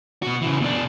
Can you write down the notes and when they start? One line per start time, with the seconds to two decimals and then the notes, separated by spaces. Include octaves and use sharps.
0.22 B2 F#4
0.41 C#3 E3
0.61 B2 D4